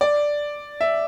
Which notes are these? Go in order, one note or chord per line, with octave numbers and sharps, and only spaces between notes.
D5
E5